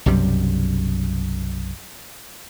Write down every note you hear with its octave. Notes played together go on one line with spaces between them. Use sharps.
B1 F#2 C3 G3